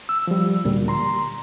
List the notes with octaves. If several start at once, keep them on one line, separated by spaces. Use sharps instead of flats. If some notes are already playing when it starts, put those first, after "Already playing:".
E6
F3 G3
D2 A#2 G3
A#5 C6